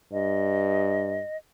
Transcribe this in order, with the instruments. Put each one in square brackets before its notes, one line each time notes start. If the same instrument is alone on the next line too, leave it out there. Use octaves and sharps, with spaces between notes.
[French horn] G2 [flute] D#5